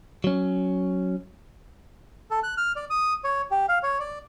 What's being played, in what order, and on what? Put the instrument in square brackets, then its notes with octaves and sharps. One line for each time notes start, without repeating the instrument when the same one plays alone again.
[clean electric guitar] F#3 C#4
[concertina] A4
F#6
F6
D5
D#6
C#5
G4
F5
C#5
D5